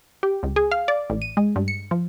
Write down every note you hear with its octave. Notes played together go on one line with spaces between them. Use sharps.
G4
C#2
G#4
F5
D5
A1
D#7
G#3
G2
C#7
F3